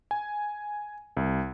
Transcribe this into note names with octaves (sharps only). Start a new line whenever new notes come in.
G#5
C2